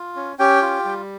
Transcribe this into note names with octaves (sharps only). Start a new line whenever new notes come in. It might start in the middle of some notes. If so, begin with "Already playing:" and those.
Already playing: F4
C#4
C#4 G4 G5
F4
G3